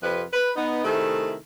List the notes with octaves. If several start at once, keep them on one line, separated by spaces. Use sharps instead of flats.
F2 C3 F3 B4
B4
B3 D#4
C3 D#3 A3 E4 G#4 A4